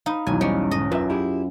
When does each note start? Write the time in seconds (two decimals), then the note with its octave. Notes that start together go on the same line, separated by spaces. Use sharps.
0.06 D#4 F5 B5
0.27 B1 E2 G#5
0.41 G3 C#4 D#4 D5
0.71 G#2 D3 D#5
0.92 F#2 F4 B4 E5
1.10 E4 G4 G#4